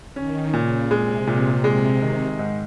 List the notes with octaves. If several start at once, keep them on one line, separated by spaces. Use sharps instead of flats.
D#3 C#4
A#2 C#3
C3 G#3
A#2
G#3
D#3
G#2